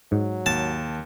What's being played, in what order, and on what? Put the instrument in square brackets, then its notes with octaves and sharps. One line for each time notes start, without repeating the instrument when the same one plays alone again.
[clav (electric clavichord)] G#2 [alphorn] F#3
[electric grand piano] D#2 [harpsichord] A5